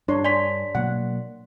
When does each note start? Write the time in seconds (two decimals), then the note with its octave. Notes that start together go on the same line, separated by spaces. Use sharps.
0.08 G2 D4 C#5 C6
0.25 D5 G#5 C6 B6
0.75 B2 F#3 A#3 F#5